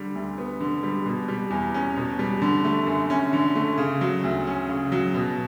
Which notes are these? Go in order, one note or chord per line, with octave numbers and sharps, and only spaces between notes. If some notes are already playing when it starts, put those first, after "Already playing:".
Already playing: D3 G3
D2
B3
D3
G3
B2
G3
E2
C#4
B2
G3
D3
A3
F#2
C#4
D3
A3
C#3
F#3
D2
C#4
C#3
F#3
B2